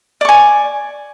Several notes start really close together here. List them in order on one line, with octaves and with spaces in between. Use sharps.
D5 C#6 G#5